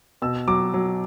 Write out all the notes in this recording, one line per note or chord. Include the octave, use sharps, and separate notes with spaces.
B2 E6
F#3 D6
F#3